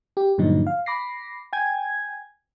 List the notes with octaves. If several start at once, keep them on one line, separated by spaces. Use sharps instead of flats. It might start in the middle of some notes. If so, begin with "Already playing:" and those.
G4
G2 A#2 D3 F3 F#3 D#4
F5
B5 D6 A#6 C7
G5 G#5 G#6